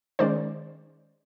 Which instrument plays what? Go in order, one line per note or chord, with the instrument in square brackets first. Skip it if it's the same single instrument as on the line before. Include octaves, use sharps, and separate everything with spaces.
[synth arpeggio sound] D#3 G#3 C#4 C5 D5